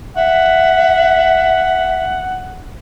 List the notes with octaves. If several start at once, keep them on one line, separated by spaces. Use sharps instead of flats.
E5 F#5